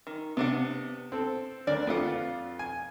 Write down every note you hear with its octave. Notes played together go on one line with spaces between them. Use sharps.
D#3
C3 B3 D4 F#5
C4 A4
D2 D4 A#4 D5
F2 F4 B4 F#5 D6
G#5